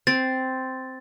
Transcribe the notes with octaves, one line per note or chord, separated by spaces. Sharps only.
C4 A6